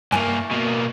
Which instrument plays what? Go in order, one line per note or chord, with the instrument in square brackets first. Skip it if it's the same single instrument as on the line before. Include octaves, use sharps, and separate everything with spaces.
[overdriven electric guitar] G2 A#3 [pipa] E3 A3 G#5
[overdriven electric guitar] B2 A#3